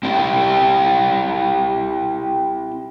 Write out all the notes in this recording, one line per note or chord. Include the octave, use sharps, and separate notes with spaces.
C4 E4 G4 G5